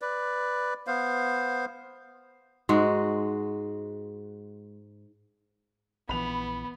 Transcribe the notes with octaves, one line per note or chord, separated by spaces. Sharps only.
B4 D5
B3 C5 F5
G#2 G#3 F#4
A#1 E3 B3 B5 F7